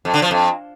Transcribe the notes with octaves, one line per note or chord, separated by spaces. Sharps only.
F2
D3
F3
F2